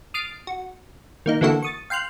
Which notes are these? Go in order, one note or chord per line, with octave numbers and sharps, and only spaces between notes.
D#6 F6 A6 C7 D7
F#4
D#3 A#3 D#4
D3 E3 A3 A#3 F#4 A4
C#6 D#6 A6
F5 G5 C6 F6 F#6